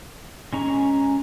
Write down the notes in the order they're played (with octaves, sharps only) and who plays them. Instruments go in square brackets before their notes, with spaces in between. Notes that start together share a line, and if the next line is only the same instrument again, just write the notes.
[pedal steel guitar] G#3 C#4 A#5 C#6